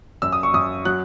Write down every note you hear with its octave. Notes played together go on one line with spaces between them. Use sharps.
F#2 E6
D#6
C#6
F#2 D#6
F#3 F#6